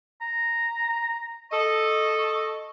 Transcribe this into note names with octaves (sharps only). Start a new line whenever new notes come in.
A#5
A4 D#5 C#6